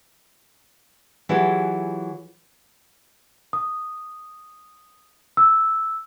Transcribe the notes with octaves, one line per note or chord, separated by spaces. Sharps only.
E3 F#3 E4 F4 G4 G#4
D#6
E6